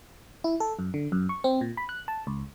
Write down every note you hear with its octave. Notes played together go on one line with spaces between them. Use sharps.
E4
A4
F#2
D3
F#2
C#6
C4
A#2
B5
F#6
A5
C#2